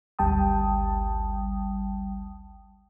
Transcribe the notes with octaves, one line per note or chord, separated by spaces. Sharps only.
G#1 D2 G3 G5 A5 D#6